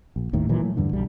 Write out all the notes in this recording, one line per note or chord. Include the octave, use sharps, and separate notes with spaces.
A#1
G1 D#2 A2 D#3
A#2 D#3 E3 F#3
F#3 A3
E2 G2 D3
B1 G3